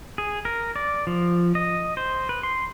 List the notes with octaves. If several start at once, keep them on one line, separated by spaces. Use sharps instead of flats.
G#4
A#4
D5
F3
D#5
C5
B4
C6